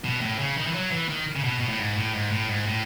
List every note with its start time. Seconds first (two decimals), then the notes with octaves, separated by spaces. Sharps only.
0.04 B2
0.21 A2
0.39 C#3
0.57 D#3
0.67 E3
0.74 F#3
0.91 E3
1.09 D#3
1.36 C#3
1.44 B2
1.60 B2
1.69 A2
1.79 G#2
1.96 A2
2.13 G#2
2.31 A2
2.49 G#2
2.66 A2